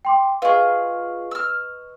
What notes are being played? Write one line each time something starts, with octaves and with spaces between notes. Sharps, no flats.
G5 C6 D6
F4 G#4 B4 D#5 C#6
E6 F6